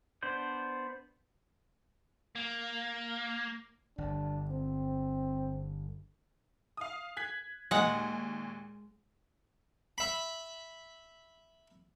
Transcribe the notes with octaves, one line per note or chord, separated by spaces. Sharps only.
B3 D4 C5 D5 G6
A#3
G1 D4
C4
F5 D#6
F#6 G#6 B6
D#2 A#2 G#3 F#5
E5 B5